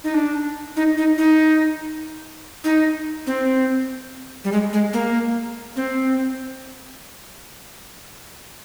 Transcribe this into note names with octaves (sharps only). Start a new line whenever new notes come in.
D#4
D4
D#4
D#4
D#4
D#4
C4
G3
G#3
G#3
A#3
C4